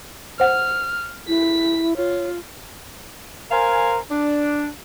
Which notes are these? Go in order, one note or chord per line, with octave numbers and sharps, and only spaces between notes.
C5 F#5 F6
E4 B6
F4 C#5
A#4 C5 F5 G#5
D4